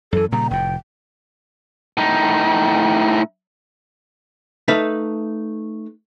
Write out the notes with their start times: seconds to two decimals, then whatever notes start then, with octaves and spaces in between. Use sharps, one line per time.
0.13 F#2 E3 A4
0.32 A#2 C#3 G3 A#5
0.51 F1 A2 G5
1.97 A2 D#4
4.68 A3 D#4 B4 E5 F5